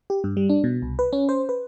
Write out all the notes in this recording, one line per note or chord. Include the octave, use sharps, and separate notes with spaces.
G4
G2
G3
D4
B2
C2
B4
C#4
C5
B4